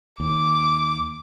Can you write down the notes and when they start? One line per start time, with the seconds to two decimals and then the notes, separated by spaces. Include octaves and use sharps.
0.20 D#2 D6